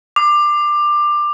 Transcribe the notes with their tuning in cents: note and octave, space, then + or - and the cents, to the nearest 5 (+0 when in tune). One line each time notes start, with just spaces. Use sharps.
D6 +20